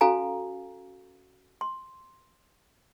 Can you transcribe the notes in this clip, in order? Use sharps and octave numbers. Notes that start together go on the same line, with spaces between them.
C#4 F#4 A4 F5 G#5 A#5
C6